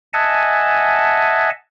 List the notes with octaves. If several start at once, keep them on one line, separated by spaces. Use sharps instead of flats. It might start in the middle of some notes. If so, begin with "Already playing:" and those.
D#5 E5 F#5 G#5 A5